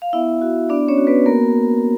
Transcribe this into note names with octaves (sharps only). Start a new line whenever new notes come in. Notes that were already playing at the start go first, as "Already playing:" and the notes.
F5
B3 E4 E5
F#4
B3 D4 D5
C#4 C#5
F#4
B3 B4
A#3 B3 A#4